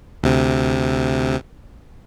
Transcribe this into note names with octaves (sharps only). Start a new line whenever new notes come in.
D2 C3